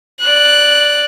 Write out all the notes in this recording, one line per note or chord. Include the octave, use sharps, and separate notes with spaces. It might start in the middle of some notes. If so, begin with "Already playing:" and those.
D5 F#6